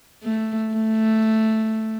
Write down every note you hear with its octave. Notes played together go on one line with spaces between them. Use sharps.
A3
A3